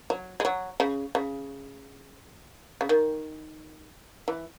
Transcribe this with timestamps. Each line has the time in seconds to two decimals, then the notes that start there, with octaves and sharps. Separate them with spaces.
0.10 F#3
0.40 G#3
0.45 F#3
0.80 C#3
1.15 C#3
2.81 C#3
2.89 D#3
4.28 E3